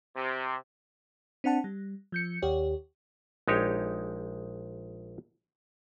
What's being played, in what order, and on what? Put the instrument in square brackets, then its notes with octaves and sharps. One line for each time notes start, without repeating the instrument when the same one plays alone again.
[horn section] C3
[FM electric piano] C4 D4 F#5 A5
G3
F3 G6 C#7
D#2 G4 C#5
[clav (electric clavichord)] A#1 G#3 D#4 G4 C#5